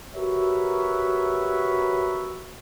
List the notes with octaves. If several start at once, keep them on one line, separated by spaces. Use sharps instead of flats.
F#4 G4 A#4 B4 C#5 E5